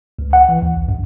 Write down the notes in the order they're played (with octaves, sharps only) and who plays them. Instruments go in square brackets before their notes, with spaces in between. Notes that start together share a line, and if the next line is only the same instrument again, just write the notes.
[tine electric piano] C#2
F#5
E3
D#2
B1
F#2